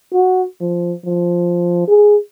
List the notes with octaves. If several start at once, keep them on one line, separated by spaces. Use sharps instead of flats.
F#4
F3
F3
G#4